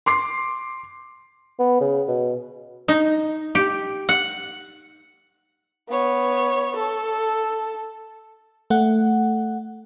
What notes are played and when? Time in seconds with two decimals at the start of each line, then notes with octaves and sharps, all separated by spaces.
0.06 C6 D6 C7
1.59 B3
1.81 C#3
2.08 B2
2.88 D#4
3.55 G4
4.09 F#5
5.89 B3 C#5
6.76 A4
8.70 A3 F#5